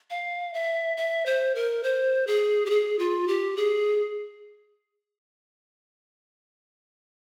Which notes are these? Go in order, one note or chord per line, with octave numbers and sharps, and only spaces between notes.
F5
E5
E5
C5
A#4
C5
G#4
G4
G#4
F4
G4
G#4